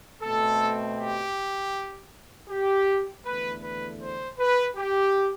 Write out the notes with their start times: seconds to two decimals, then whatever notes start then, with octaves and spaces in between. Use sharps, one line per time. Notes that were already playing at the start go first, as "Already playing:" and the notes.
0.22 B2 A3 C4 A4
0.97 G4
2.49 G4
3.24 E2 D3 A3 B4
3.62 B4
4.01 C5
4.39 B4
4.77 G4